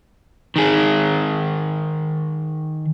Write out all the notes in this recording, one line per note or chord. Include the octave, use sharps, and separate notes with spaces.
D#3 G#4